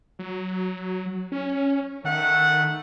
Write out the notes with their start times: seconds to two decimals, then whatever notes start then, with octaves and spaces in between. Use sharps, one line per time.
0.19 F#3
1.32 C#4
2.04 D#3 A3 F#5